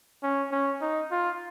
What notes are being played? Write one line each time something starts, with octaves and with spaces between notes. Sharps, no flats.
C#4
C#4
D#4
F4